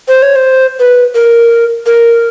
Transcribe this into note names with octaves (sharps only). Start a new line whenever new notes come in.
C5
C#5
C5
B4
A#4
A#4